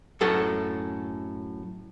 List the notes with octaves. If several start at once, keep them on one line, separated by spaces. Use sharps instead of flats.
F#2 A2 A4 F#5 A5